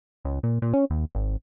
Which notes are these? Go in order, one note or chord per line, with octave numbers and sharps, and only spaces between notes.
C#2
A#2
A#2
C#4
D#2
G#1